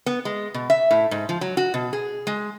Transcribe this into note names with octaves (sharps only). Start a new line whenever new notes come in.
B3
G#3
B2
E5
A2
G#2
F3
F#3
F#4
B2
G#4
G#3